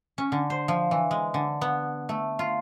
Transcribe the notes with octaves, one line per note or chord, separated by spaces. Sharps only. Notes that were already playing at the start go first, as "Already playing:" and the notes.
C#4
D3
C5
F3
E3
G#3
D3
B3
A3
F4